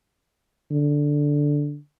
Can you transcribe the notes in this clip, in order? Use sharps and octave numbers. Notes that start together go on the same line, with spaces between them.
D3